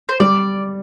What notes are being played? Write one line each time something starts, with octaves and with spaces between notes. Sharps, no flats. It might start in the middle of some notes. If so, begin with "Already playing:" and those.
C5
G3 D5